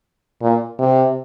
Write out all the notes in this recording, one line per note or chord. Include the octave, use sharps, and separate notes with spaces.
A#2
C3